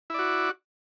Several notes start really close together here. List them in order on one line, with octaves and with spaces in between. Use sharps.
E4 D5 F#4